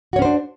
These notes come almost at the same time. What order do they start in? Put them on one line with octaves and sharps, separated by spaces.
F#4 C#5 C#4 C5 D4